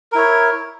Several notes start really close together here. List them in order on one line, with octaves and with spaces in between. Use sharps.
A#4 E4 C#5